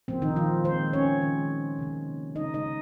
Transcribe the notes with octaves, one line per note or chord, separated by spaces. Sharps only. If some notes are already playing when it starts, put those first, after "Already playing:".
A#2 F3 A#3 C4
D#3 D#4
F3 F4
D#3 G#3 C4 C5
C#4 C#5
D#3 G#3
C3 D#3 A#3
C#3 G#3 D#4 D#5
D#4 D#5